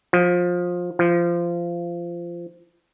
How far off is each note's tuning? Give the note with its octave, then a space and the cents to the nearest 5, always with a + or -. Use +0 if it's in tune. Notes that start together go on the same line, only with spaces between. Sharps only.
F3 +20
F3 -20